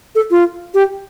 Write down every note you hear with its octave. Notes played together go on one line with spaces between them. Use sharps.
A4
F4
G4